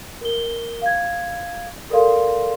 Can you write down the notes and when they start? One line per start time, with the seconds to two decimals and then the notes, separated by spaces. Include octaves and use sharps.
0.21 A#4 G7
0.82 F5 G#6
1.90 A4 A#4 D5 F5 C6